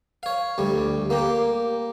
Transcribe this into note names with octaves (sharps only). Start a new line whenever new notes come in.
C#5 F5
D2 G3
A#3 G4